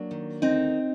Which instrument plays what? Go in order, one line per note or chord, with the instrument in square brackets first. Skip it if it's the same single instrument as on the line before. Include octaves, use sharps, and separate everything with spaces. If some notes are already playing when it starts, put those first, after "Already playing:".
Already playing: [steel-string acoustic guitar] F#3 A#3 D4
D#3
D2 C4 D#4